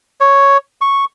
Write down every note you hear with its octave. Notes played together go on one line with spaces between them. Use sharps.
C#5
C#6